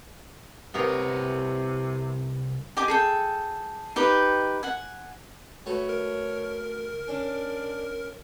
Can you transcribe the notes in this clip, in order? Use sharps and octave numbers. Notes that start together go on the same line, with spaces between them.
C2 C3 B3 A#4 C#5
G4 D#5 G#5 D6
G#4 A4 G5
D#4 G4 B4 G5
F#5 G#5
A3 F#4 B4 C#5
A#4
C#4 D4